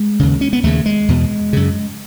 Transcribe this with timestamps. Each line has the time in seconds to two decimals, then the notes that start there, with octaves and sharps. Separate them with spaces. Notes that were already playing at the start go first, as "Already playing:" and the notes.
Already playing: G#3
0.19 D#2 C#3
0.41 C#4
0.53 B3
0.63 D#2 C#3 A3
0.86 G#3
1.08 E2 B2
1.53 F#2 C#3